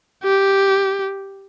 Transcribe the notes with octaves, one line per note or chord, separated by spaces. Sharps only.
G4